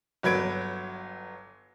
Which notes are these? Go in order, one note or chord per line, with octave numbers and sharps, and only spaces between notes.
G1 F#3 B4 G#6 D7